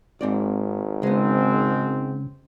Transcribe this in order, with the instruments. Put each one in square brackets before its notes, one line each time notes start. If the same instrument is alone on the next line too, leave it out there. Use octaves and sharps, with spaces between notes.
[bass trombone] G#1 [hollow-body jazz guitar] G#2 C4 D5
[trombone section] G#2 C4 [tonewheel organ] C#3 [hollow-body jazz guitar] G#3 B3